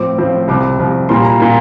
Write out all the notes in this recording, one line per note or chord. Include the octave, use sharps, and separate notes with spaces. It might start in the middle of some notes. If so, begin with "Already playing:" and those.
Already playing: A2 F3 C4 D6
A2 F3 C4
C2 C3 F3 D6
C2 C3 F3
A#2 G3 A#3 C6
A#5
A#2 G3 A#3